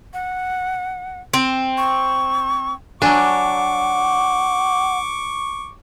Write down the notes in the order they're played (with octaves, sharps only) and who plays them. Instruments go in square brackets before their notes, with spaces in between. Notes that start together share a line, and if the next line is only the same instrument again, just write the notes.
[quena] F#5
[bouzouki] C4
[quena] C#6
[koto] F#3 D4 [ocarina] F#5 [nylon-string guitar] G#5 [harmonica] C#6 D6